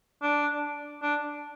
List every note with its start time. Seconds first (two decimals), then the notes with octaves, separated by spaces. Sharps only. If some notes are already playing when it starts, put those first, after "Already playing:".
0.22 D4
1.02 D4